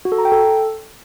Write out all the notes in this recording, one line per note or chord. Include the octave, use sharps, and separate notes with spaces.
F#4
A4
A#5
G5
A4